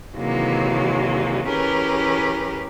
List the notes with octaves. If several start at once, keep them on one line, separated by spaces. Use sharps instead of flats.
C3 D#3 E3 F#3 G#3 A#3
E3 C#4 G4 G#4 A#4 B4